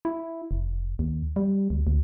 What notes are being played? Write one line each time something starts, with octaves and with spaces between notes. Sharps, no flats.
E4
F1
D#2
G3
D2
D2